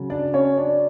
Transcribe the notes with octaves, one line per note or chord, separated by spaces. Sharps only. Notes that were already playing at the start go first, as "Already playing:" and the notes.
Already playing: C#3 F#3
D4 D5
C#4 C#5
D4 D5